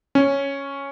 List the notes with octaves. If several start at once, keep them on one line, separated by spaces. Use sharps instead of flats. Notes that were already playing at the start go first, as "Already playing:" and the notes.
C#4